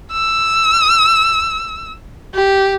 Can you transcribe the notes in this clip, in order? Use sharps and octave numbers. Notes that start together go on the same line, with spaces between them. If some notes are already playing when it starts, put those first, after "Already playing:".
E6
G4